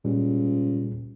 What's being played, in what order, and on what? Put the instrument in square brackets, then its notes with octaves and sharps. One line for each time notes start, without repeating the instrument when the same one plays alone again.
[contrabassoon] C#2 [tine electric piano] A#2 G3